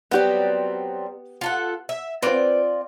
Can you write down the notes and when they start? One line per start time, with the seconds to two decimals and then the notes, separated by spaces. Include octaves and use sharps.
0.11 F#3 G3 B3 C4 G4
1.41 F4 A4 F#5
1.89 E5
2.22 C4 F4 B4 C5 D5